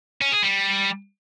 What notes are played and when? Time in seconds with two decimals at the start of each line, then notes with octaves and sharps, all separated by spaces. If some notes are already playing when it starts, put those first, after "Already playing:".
0.21 C#4
0.32 G#4
0.42 G3